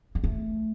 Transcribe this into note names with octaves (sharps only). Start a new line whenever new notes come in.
G#3
A3